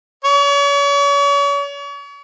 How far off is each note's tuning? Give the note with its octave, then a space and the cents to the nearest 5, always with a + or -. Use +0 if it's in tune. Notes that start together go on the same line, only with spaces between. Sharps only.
C#5 +40